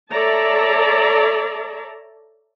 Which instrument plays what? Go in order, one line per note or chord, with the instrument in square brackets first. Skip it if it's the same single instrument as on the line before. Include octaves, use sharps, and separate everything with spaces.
[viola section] A4 C#5 D5 E5 A5 A#5